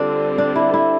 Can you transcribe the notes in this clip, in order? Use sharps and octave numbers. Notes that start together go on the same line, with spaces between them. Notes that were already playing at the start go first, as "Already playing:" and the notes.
Already playing: D3 G3 C4 D4 F4
D4
E4
E4